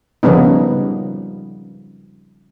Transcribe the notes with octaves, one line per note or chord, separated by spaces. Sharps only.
C#3 F3 G3 B3 D#4